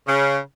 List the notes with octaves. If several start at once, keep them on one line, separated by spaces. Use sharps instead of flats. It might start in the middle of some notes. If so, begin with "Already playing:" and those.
C#3